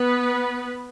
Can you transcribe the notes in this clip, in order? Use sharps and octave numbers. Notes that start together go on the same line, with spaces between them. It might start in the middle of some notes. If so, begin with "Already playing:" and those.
Already playing: B3 B4